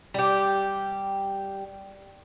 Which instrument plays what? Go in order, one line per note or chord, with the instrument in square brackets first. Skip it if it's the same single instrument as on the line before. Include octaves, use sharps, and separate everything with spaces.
[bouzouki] G3 G4